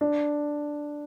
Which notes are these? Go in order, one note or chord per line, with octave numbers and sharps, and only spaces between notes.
D4